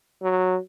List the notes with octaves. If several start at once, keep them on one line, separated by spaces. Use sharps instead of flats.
F#3